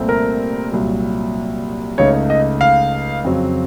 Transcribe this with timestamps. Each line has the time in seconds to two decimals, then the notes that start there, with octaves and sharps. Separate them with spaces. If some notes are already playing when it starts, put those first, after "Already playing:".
Already playing: C2 A#2 A3 C4
0.09 A#4
0.72 C2 A#2 F#3
1.98 C#2 C#3 A3 D#4 C#5
2.30 D#5
2.61 F5
3.24 F2 C#3 F#3 C4